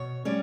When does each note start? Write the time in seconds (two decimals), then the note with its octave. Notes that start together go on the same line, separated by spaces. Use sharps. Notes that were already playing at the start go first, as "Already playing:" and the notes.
Already playing: B2 C#5
0.25 G3 C#4 D5